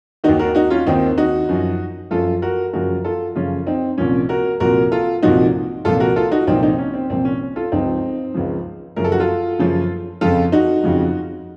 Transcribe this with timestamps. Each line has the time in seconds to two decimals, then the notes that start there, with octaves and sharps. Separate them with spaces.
0.24 D#2 D#3 D#4 F#4
0.39 F#4 A#4
0.55 D#4 F#4
0.70 C#4 F4
0.87 D#2 D#3 C4 D#4
1.18 D#4 F#4
1.49 F#2 F3
2.11 F#2 F3 F4 A4
2.42 F#4 A#4
2.73 F#2 C#3 F3 F#4 A#4
3.04 F4 A4
3.35 F#2 C#3 F3 C#4 F4
3.67 C4 D#4
3.98 C2 A#2 F3 C#4
4.29 F#4 A#4
4.60 C2 A#2 F3 F#4 A#4
4.92 F4 A4
5.23 C2 A#2 F3 D#4 F#4
5.85 C2 A#2 F3 F4 A4
6.00 F#4 A#4
6.16 F4 A4
6.32 D#4 F#4
6.47 C2 A#2 F3 C4 D#4
6.63 C4 D#4
6.78 C#4
6.94 C4
7.10 C2 A#2 F3 C4
7.25 C#4
7.41 C#4
7.56 F4 A4
7.72 C#2 C#3 F3 C4 D#4
8.34 C#2 C#3 F3
8.96 F#2 C#3 F3 A#4
9.04 A4
9.12 F#4
9.20 F4 A4
9.59 F#2 C#3 F3
10.21 F2 C#3 F3 F4 A4
10.52 D#4 F#4
10.84 F2 C#3 F3